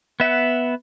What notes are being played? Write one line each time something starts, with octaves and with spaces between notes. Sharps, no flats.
B3 E5 F#5